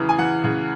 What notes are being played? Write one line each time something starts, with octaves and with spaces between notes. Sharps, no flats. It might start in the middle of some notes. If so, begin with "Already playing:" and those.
Already playing: E2 C#3 E3 D#6
G#5
E3 F#5
C#3